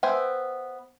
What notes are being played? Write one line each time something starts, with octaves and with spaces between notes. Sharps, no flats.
B3 C5 E5 G5 G#5